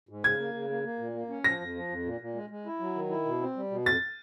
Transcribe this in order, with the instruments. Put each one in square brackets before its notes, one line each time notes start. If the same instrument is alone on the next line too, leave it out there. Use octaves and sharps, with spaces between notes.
[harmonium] G#2
[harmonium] C#3 [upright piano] G#6
[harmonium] A#3
C#3
A#3
A#3
A#2
A#3
C#4
[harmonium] F3 [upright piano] A#6
[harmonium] F2
F3
F2
A#2
A#2
G#3
G#3
E4
F#3
D#3
E4
B2
C4
G3
B2
[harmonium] F2 [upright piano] A6